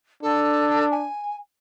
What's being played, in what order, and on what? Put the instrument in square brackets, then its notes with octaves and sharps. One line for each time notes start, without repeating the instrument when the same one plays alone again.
[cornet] D4 [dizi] A4
[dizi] G#5